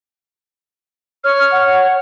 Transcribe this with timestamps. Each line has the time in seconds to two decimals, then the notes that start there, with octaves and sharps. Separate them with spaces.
1.24 C#5 F6
1.52 F#5